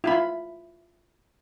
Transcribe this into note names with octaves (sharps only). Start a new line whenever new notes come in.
E4 F4 B5